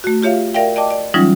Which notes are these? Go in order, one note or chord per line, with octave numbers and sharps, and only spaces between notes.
A3 F#4
F4 G4 C#5 E5 F5
A#4 D5 E5 F5 G5
D5 D#5 G5 A5 D6
D5
E3 F#3 G3 C#4 D#4 F4